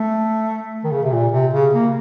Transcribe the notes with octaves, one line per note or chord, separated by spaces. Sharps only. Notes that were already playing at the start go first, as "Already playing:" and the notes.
Already playing: A3
D#3
C#3
C3
A#2
C3
C#3
A#3